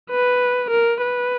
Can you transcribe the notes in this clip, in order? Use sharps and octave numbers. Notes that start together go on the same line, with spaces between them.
B4
A#4
B4